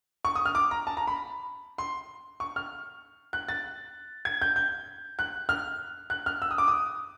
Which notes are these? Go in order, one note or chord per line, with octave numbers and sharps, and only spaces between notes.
C#6
D#6
F6
D6
A#5
A5
A#5
B5
C6
C#6
F6
F#6
A6
G#6
G6
G6
F#6
F6
F#6
F6
E6
D#6
D6
D#6